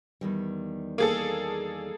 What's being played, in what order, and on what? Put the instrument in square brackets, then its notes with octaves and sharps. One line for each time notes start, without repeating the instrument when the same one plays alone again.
[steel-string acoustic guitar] E2 D#3 G3
[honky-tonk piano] A#3 G#4 A4